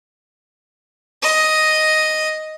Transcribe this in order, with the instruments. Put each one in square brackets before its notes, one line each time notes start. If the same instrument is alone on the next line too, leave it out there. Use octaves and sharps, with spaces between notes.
[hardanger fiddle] D#5